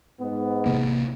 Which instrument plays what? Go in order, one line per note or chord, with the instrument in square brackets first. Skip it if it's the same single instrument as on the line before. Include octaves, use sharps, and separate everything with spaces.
[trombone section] G#2 B3
[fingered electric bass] A1 C3 A#3